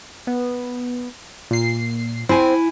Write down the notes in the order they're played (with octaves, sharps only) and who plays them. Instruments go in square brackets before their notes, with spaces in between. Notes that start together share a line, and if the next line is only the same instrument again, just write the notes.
[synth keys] B3
A#2 C7
[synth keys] C4 [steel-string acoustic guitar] E4 G#5